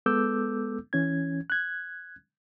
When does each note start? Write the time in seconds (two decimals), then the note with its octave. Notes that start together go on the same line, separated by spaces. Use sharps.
0.06 G#3 B3 A4 D6 E6 G6
0.93 E3 C#4 G#6
1.50 F#6 G#6